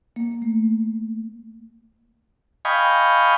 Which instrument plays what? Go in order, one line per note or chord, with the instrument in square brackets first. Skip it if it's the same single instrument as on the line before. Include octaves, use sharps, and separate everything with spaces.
[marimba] A#3
A3
[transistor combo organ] D#5 F5 G5 G#5 B5 C#6